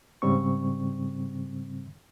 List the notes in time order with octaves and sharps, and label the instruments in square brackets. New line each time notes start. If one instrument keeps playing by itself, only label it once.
[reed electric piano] G#2 C#3 G3 C4 C#6